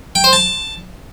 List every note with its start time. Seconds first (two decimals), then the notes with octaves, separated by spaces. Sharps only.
0.15 G5
0.24 C5
0.33 A5